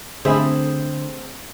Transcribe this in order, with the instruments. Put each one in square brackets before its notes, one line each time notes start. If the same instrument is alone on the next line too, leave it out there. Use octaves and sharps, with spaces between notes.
[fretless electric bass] D3 [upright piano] A3 C4 [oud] G#4 [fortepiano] C5 E5 B5